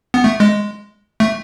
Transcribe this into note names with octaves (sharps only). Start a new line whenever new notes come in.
B3
A3
G#3
A3